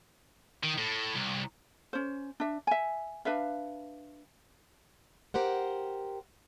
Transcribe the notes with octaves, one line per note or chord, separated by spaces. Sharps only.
D#3
A2
C2
C#4 C5
D4 E5
E5 G#5
D4 B4 E5 F5
G4 A#4 C5 F#5